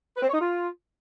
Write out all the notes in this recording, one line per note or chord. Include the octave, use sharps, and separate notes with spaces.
B4
C4
C#5
D#4
F4